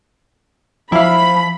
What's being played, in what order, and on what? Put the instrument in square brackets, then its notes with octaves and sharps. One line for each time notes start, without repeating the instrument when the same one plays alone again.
[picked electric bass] F3 [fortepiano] E4 F5 [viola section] B5